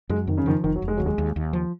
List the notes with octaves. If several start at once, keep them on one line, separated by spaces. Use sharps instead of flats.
F#2 G#3
F2 D#3
C#3
D#3 F3
F1 D#3
F#3
F1
G#3
D#2 F#3
G#3
D#2
D#2
F3